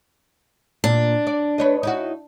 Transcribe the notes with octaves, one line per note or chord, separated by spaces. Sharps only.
A#2 D4
D5
B4 C#5 D#5
D#4 E4 F#4